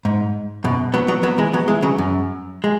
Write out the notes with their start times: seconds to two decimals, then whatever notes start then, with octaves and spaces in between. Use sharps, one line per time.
0.05 G#2
0.64 F#2 B2
0.94 F#3 B3
1.08 F#3 B3
1.23 F#3 B3
1.38 E3 G#3
1.53 F#3 B3
1.68 E3 G#3
1.82 C#3 F#3
1.98 F#2
2.64 G#3